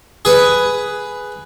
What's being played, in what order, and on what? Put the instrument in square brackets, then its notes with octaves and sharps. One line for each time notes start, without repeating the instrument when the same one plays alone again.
[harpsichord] G#4 B4